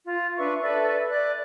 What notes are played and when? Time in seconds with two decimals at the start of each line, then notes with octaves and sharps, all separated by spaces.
0.05 F4
0.37 D4 B4 E5 C#6
0.62 A4 B4 D5 E5
1.09 D5 F#6